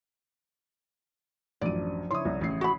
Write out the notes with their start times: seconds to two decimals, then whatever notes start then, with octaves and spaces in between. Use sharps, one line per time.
1.61 A1 F#2 F3 D4 D5 D#7
2.11 C#3 E4 C#5 C6 D#6
2.25 C2
2.41 A1 C7
2.61 F#4 B5